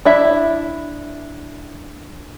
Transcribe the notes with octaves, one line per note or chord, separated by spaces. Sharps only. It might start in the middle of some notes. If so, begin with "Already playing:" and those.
D4 E4 E5